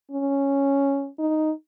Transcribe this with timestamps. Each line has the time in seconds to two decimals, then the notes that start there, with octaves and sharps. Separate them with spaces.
0.11 C#4
1.19 D#4